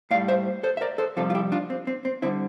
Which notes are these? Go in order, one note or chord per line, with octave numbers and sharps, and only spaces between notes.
A2 G3 D5 F5
C5 E5
A4 C5
E5
A#4 D5
A4 C5
F2 C3 G3 F4 A4
F4
E4 G4
D4 F4
C4
C4
C4
D3 G3 C4 E4